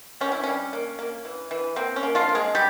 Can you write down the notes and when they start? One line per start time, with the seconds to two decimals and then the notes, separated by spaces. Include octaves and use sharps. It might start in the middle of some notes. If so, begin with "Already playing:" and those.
0.21 G3 C#4
0.32 E4
0.43 G3 C#4
0.73 A#3
0.99 A#3
1.25 E3
1.51 E3
1.76 A#3 C4
1.96 C#4
2.03 A#3
2.15 F3 F4
2.29 A#3
2.35 G#3 G#4
2.55 G3 G4